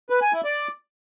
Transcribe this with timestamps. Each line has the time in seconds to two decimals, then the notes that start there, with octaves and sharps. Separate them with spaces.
0.10 B4
0.21 G#5
0.33 E4
0.44 D5